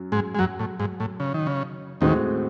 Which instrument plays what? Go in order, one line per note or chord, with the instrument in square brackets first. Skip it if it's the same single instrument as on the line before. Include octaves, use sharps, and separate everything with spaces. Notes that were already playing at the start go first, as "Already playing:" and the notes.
Already playing: [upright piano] F#2 F#3
[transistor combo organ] G#2 G#3
G#3
F#2 F#3
A2
G#2
A2
C#3
D#3
C#3
[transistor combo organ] D#2 D#3 [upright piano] A2 G#3 C4 F#4